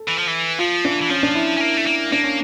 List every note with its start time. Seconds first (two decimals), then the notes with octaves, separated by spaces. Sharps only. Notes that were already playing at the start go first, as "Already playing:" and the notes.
Already playing: A4
0.08 E3
0.18 F3
0.28 E3
0.59 F3 F4
0.85 E3 D4
1.01 E3
1.10 F3 C#4
1.23 D4
1.35 E4
1.56 C#4
1.60 A#3
1.77 A3
1.86 A#3
2.12 A#3 D4
2.24 C#4